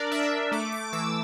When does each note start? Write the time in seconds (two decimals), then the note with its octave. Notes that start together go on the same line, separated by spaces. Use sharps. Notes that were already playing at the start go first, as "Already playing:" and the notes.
Already playing: D4 A#4 D5
0.11 D4 E5
0.52 A3 D6
0.72 D6
0.93 E3 E6